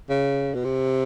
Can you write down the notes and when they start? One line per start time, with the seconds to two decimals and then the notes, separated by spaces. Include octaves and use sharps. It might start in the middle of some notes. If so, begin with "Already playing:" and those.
0.09 C#3
0.54 B2
0.65 C3